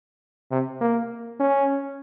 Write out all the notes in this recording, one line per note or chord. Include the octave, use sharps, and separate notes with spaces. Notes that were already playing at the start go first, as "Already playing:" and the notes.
C3
A#3
C#4